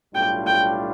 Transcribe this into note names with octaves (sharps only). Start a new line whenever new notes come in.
B1 A2 G3 D4 F4 G5
G5